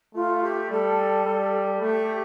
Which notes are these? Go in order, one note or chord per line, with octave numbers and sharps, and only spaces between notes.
A3 F4
G4
G3 A4
G3
A3 G4